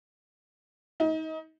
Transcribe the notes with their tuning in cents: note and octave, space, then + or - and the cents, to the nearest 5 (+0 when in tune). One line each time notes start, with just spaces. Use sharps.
D#4 +30